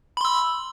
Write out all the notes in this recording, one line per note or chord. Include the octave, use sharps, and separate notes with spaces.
B5 C6 E6